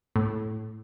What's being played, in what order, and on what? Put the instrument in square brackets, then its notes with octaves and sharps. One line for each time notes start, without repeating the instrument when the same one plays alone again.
[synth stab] A2